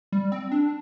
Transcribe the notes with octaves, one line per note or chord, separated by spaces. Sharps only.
G3
C4
D4